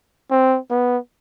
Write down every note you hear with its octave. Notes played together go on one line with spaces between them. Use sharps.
C4
B3